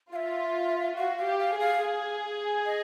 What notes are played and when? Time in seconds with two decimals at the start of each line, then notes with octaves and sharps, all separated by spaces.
0.12 F4 F5
0.16 E5
0.97 F#4 F5
1.18 F5
1.25 G4
1.39 F5
1.54 G#4
1.60 F5
1.82 G#4
2.66 D#5